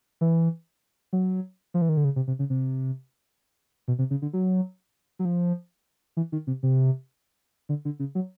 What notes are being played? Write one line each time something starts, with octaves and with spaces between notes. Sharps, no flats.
E3
F#3
F3
E3
D#3
D3
C#3
C3
C3
C#3
C3
B2
C3
C#3
D3
F#3
F#3
F3
E3
D#3
C3
C3
D3
D3
C#3
F#3